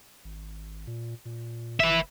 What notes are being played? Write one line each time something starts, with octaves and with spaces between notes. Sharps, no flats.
G#1
A#2
A#2
F#1 B4 E5